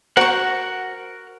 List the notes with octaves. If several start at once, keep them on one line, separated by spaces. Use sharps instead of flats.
F#4 A#4 C5 F#5 C#6